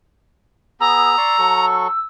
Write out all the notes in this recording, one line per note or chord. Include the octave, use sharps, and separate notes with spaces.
B3 G#4 A#5 E6
D5 C6 C#6
F#3 A4 C#6